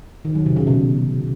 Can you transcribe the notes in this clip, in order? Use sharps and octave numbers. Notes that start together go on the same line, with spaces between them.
D#3
F#3
C3
C#3
B2